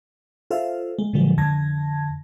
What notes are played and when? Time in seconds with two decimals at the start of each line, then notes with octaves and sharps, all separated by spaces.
0.50 F4 A4 C5 E5 F5
0.99 G#3
1.13 A#2 D3 F3 F#3 G#3
1.38 F2 D3 A5 G#6 A#6